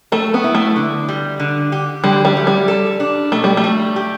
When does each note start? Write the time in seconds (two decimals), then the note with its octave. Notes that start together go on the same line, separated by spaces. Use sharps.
0.12 A3 A4
0.34 B3
0.44 E4
0.55 A3
0.76 D3
1.08 G3
1.39 D3
1.72 G4
2.03 D3 G3
2.25 G3
2.37 A3
2.47 G3
2.68 A4
3.00 D4
3.32 B2 A3
3.44 G3
3.57 A3
3.64 G3
3.96 G4